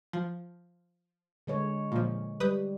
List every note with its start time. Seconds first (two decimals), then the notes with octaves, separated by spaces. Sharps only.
0.13 F3
1.47 D3 G#3 C#5
1.92 A#2 F3
2.40 G3 B4 D#6 G6